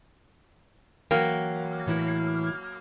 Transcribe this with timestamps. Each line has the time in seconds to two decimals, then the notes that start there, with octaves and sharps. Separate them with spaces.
1.11 E3 F#3 A#3 G5
1.87 A2 E3 E4